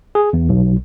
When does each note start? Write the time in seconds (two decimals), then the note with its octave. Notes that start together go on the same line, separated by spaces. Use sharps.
0.15 G#4
0.33 E2
0.49 B1